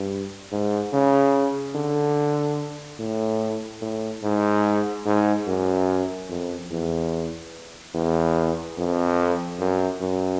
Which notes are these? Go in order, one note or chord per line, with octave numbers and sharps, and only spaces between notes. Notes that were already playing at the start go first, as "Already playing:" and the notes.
Already playing: G2
G#2
C#3
D3
A2
A2
G#2
G#2
F#2
F2
E2
E2
F2
F#2
F#2